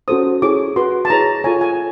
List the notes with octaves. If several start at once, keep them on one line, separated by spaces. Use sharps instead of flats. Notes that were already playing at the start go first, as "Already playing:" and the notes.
C#4 F#4 A4 C5 D#6
E4 G#4 C#5 D6
F#4 B4 C6
A5
E4 G#4 C#5 A#5
F4 A4 C#5 G#5
G#5